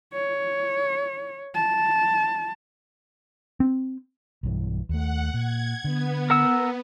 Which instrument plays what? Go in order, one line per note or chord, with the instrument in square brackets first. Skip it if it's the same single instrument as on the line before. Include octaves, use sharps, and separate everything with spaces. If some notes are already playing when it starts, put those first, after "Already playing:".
[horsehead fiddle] C#5
A5
[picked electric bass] C4
[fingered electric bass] B1 G2 E3
[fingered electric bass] D#2 A3 [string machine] F#5
[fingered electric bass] A#2 [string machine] G#6
[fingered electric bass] D3 [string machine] B3
[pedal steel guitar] A#4 F#5 E6